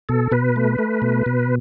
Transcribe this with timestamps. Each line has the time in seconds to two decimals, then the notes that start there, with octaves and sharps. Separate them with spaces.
0.09 B2 A4
0.32 B2 B4
0.56 A3
0.79 A3
1.02 B2
1.26 B2